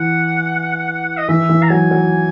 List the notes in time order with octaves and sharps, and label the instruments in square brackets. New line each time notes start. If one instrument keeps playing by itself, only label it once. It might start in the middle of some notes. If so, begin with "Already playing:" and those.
Already playing: [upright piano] E3 [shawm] F#5
[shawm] D#5
[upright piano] E3 [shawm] E5
[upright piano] E3
[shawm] A#5
[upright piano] F#3 [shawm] G#5
[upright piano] F#3